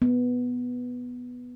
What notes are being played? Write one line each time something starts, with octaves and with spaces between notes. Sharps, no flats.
B3